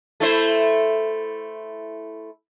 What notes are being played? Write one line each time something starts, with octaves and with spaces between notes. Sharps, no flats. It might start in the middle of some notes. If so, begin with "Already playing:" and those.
A3 E4 C5